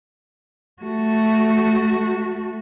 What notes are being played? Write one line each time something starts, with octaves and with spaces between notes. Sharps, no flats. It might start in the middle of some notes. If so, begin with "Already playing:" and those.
A3 F#4